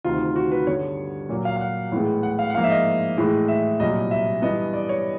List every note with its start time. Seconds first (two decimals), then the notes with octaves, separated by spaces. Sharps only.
0.04 D2 C3 D#3 F4
0.36 F#4
0.51 B4
0.67 G2 D3 G3 B3 C#5
1.29 A#2 F#3 A#3
1.45 F5
1.56 F5
1.61 F#5
1.92 A2 E3 G#3 B3
2.23 F#5
2.39 F5
2.50 F#5
2.55 G#2 F3 A#3 F5
2.64 E5
2.70 D#5
3.17 A2 E3 G#3
3.48 E5
3.80 C2 A#2 F#3 D#5
4.11 E5
4.42 G2 E3 G3 B3 D#5
4.73 D5
4.89 C#5